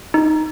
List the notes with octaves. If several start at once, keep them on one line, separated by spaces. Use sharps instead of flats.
D#4